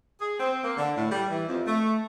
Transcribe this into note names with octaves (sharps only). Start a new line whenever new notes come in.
G#4
C4
A#3
D3
A2
G3
E3
F2
A3